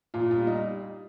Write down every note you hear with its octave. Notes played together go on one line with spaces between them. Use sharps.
A#2 F4
G3 F4
D#4